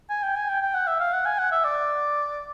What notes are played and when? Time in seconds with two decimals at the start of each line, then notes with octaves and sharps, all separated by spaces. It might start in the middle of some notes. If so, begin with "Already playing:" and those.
0.10 G#5
0.23 G5
0.36 G#5
0.49 G5
0.62 G5
0.74 F#5
0.87 E5
1.00 F5
1.13 F#5
1.26 G#5
1.39 F#5
1.52 E5
1.64 D5